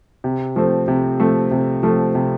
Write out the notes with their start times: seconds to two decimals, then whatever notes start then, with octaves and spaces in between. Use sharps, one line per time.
0.24 C3
0.56 F3 A3 C4
0.88 C3
1.20 F3 A3 C4
1.51 C3
1.83 F3 A3 C4
2.15 C3